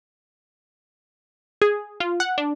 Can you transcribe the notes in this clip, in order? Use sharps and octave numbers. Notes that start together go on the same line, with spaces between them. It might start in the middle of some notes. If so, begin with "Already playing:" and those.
G#4
F4
F#5
D4